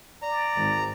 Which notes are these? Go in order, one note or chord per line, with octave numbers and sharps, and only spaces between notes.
D5 A#5
G#1